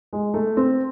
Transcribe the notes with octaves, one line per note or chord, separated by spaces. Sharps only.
G#3
A3
C4